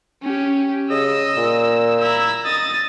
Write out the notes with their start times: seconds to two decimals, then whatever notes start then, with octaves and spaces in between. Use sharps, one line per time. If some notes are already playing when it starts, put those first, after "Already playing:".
0.23 C#4 G4
0.90 C#3 D#5 E6
1.37 A#2
2.00 E4 A#5 E6
2.45 D#5 D#6 A6